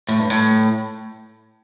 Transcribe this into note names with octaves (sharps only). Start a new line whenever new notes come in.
A2
G2
A2